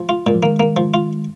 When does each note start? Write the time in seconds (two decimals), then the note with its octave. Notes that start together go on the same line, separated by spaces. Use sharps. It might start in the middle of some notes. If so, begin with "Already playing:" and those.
Already playing: F3
0.09 F4
0.26 A#2 G#3
0.34 F3
0.43 D#3 G#3 A#3
0.60 A#3
0.77 F3
0.94 F4